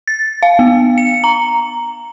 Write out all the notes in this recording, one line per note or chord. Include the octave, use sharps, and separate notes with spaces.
A6
F5
B3
C#7
A#5